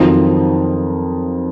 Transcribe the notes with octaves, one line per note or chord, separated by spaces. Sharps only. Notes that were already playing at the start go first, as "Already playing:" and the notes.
Already playing: F2 D#3 F#3 F4